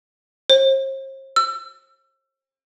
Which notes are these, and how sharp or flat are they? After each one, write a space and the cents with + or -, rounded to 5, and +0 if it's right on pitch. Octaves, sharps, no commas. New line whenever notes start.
C5 +40
E6 +30